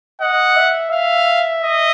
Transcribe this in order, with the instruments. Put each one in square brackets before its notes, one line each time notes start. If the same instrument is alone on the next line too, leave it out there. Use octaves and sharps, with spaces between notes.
[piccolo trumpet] D#5 [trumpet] F#5
[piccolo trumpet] E5
[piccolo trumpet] E5 [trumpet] F5
[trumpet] D#5